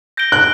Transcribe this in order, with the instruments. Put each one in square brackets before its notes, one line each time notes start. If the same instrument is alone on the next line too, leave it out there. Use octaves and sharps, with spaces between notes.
[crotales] G6 A#6 D7 G7
[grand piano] F#6